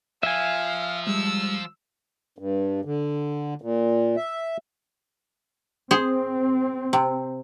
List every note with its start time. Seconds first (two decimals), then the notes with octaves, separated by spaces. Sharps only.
0.23 F3 E5 F5 G#5
1.07 G3 G#3 E6
2.39 G2
2.85 D3
3.62 A#2
4.16 E5
5.91 C4 G#4 C5
6.93 C3